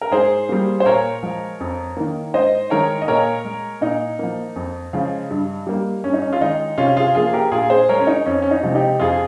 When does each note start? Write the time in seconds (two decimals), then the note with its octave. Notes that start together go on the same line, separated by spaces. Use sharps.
0.01 A#4
0.12 G#2 G#4 C5
0.49 G3 A#3
0.80 C5
0.86 A#2 A#4 C#5
1.23 F3 G#3
1.60 F2
1.97 D#3 A#3
2.34 G#2 C5 D#5
2.70 D#3 G#3 A#4 C#5
3.02 D#5
3.08 A#2 A#4 C#5
3.44 G#3
3.81 A#2 D#4
4.19 F3 A#3
4.56 F2
4.93 C#3 F3 G#3
5.31 G2
5.67 G3 A#3
6.04 G2 C#4
6.13 D#4
6.22 C#4
6.33 F4
6.41 D#3 G#3 D#4
6.78 C3 C#4 F4
6.97 F4 G#4
7.15 F3 A#3 F4 G#4
7.33 G4 A#4
7.52 A#2 F4 G#4
7.70 G#4 C5
7.89 G#3 A#4 C#5
8.00 C#4
8.07 D#4
8.26 F2 C#4
8.42 C#4
8.51 D#4
8.63 C3 F3 G#3
8.75 D#4 G4
9.00 F2 F4 G#4